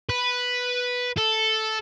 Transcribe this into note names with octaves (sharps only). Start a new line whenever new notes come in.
B4
A4